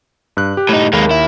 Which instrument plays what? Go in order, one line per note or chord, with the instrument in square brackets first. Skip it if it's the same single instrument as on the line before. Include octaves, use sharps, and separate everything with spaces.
[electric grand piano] G2 F#6
G4
[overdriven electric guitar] A2 D#4
[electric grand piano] D#2 A#4 B5 [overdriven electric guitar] G#3 A#3
[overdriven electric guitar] E4